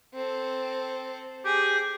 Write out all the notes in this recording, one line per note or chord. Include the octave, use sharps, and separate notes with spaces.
C4 A4
G4 G#4